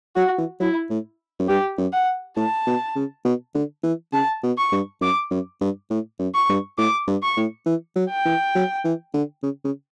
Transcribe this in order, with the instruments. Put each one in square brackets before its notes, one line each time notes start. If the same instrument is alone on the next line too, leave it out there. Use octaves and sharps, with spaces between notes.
[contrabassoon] F#3 [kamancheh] F#4
[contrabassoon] E3
[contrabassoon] F#3 [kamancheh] E4
[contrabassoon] A2
F#2
[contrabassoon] G2 [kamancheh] G4
[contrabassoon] F#2
[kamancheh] F#5
[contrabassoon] A2 [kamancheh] A5
[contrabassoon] B2
C#3
B2
D3
E3
[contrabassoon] C#3 [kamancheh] A5
[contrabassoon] B2
[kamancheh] C#6
[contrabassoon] G2
[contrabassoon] F#2 [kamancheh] D6
[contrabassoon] F#2
G2
A2
F#2
[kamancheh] C#6
[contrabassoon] G2
[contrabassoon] A2 [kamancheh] D6
[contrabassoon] G2
[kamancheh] C#6
[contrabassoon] A2
E3
F#3
[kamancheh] G5
[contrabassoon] E3
F#3
E3
D3
C#3
C#3